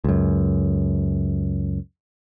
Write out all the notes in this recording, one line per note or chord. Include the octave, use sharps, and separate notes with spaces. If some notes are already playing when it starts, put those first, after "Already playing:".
C#2 F#2